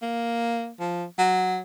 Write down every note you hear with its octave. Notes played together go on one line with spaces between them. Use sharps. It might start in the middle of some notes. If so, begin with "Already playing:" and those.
A#3
F3
F#3